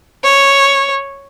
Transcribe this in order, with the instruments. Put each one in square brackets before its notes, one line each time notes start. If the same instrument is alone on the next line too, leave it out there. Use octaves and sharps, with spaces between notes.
[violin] C#5